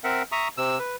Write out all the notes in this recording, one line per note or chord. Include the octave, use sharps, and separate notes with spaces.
C4 A#4 E5 F#5
E5 A#5 C#6 D#6
C3 E6
B4